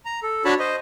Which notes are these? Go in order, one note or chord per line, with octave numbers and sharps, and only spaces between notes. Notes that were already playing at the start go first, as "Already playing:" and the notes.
A#5
A4
D4 F#4 C#5 A5 B5
C5 D#5